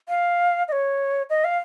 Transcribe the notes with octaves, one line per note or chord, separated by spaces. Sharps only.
F5
D#5
C#5
D#5
F5